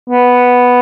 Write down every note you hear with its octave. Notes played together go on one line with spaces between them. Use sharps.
B3